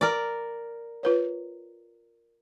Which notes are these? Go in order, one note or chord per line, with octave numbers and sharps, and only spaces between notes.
A#4 D5
F4 B4 C#5